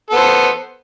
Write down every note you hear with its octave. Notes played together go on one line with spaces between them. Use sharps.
B3 A4 C5